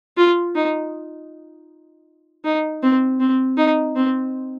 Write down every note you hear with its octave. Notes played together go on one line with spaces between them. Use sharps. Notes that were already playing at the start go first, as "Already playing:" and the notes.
F4
D#4
D#4
C4
C4
D#4
C4